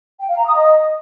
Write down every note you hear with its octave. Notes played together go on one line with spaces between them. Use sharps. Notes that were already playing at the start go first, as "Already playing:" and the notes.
G5
F5
A#5
D#6
D#5